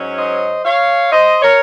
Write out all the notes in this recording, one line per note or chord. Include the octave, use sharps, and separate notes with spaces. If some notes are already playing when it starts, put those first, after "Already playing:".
Already playing: G#2 F#3 C#4
C5 D#5
C#5 F5
C5 D#5
A#4 C#5